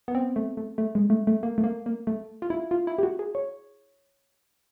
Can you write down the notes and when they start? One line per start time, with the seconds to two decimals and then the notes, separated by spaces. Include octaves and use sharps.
0.08 B3
0.15 C4
0.36 A3
0.57 A3
0.78 A3
0.95 G#3
1.10 A3
1.27 A3
1.43 A#3
1.58 A3
1.64 A#3
1.86 A#3
2.07 A3
2.42 F4
2.50 E4
2.71 F4
2.87 E4
2.99 G4
3.03 F#4
3.19 G#4
3.35 C#5